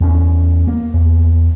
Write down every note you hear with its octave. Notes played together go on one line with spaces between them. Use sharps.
E2 C#4
A#3
E2